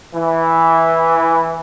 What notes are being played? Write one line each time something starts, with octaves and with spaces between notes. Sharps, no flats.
E3